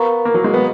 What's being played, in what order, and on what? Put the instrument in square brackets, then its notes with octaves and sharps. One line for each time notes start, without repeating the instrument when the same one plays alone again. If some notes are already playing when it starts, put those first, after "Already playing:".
Already playing: [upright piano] B3 [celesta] A#4 F5 A#5 C#6
[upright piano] A#3
F#3
G#3
B3